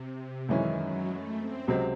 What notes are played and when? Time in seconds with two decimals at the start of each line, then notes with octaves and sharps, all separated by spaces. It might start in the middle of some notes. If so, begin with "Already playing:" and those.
Already playing: C3
0.49 F#2 D#3 E3 G#3 C#4 E4
0.79 F#3
1.07 A3
1.38 C4
1.68 C#2 C3 F#3 C4